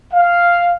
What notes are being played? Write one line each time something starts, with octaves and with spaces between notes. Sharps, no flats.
F5